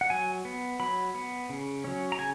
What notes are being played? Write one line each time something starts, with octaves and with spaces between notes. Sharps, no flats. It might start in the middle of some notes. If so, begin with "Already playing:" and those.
F#5
F#3 G#5
B3
F#3 B5
B3
C#3
F#3 C#4
A#5
C#3 G#5